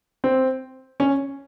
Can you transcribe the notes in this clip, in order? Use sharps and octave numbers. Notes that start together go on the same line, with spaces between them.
C4
C#4